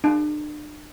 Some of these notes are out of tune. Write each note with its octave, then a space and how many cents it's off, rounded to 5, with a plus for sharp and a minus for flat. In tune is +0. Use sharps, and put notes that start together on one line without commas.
D4 +35